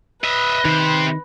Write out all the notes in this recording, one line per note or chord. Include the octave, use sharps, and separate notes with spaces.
B4 D#5 E5
C3 D#3 C5